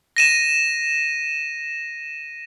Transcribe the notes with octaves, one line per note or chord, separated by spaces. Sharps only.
A#6 D#7 E7